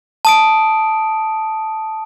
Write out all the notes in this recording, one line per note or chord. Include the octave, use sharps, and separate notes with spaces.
A5 D#6 D7